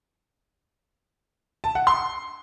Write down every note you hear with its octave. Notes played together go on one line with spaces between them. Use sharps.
A5
F#5
C6